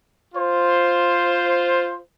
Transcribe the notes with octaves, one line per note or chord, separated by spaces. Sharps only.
F4 C5